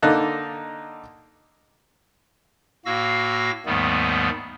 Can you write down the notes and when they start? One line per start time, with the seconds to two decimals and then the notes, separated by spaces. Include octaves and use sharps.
0.02 D3 A#3 D#4 A5 F#6
2.86 A2 A#3 F#4 F5 E6 A#6
3.66 D#2 G#2 D#3 G3 A3 B3